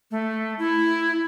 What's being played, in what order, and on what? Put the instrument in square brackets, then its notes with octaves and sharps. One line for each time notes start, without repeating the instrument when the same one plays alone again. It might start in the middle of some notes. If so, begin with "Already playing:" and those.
[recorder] A3
E4